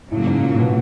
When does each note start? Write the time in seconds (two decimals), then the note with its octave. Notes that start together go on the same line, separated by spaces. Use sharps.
0.10 A2 C#3 F#3 A#3
0.27 G#2
0.43 A#2
0.59 B2